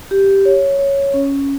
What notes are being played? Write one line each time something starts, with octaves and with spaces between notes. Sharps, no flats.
G4
C#5
C#5
C#4